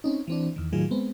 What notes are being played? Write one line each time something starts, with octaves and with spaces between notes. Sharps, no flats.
C4 C#4 D#4
E3 C4 D4
E2 D#3
A2 D#3 F#3 F4 G#4
G#3 B3 C4